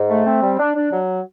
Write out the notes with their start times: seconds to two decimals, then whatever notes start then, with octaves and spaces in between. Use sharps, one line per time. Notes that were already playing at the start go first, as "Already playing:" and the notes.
Already playing: G#2
0.10 A3
0.25 C4
0.42 G3
0.59 D4
0.76 D4
0.92 F#3